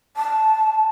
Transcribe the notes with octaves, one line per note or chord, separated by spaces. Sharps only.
A5